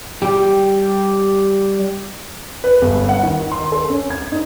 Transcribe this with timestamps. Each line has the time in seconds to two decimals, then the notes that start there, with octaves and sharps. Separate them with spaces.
0.22 G3 G4
2.64 B4
2.82 G1
3.09 F#5
3.23 D#3
3.52 C6
3.72 A4
3.90 C#4
4.10 G#6
4.32 D#4